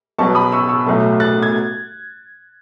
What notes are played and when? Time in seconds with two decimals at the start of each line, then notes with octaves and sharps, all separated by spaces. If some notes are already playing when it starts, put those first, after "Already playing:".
0.18 B1 B2 F#3 B3 A5 C#6
0.35 B5 D#6
0.52 C#6 E6
0.69 C#6 E6
0.86 B1 A2 F#3 A3
1.20 F#6 A6
1.42 G#6